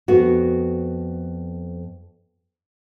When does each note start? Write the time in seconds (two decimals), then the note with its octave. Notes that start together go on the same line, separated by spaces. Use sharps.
0.08 F2 B3 F#4